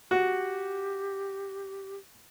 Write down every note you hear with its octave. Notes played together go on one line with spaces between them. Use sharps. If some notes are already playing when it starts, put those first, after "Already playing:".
F#4 G4